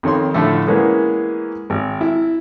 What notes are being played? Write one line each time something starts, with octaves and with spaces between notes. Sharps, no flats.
F2 D#3 C#5 C6
A2 D3 F3 A3 A4
E3 G#3 A#3 B3 C#4
G#1
E4